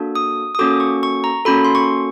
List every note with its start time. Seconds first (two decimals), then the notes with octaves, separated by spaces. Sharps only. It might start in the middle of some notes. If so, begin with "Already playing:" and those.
Already playing: A#3 D4 F#4 A4
0.15 D#6
0.55 D#6
0.59 A#3 C#4 F#4 A4 D6
0.80 C#6
1.03 C#6
1.24 A#5
1.45 A#3 C#4 F#4 A4 B5
1.64 C6
1.75 C#6